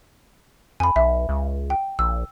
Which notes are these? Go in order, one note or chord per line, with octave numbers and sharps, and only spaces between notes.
F2 G#5 B5
B1 E5
C#2
G5
A#1 E6